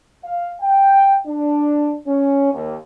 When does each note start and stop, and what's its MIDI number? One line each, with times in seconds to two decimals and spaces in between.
0.24 0.52 77
0.61 1.15 79
1.26 1.93 62
2.07 2.53 61
2.53 2.75 39